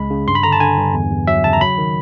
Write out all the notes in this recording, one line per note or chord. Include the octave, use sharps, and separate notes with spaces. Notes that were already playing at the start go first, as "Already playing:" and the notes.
Already playing: C#2 C#3 G#3 B5
C#3
G2 C6
B5
D3 A#5
A5
D3 G#5
G2
E2
E2
F#3 E5
C#3 A5
A#5
F#3 B5
D#3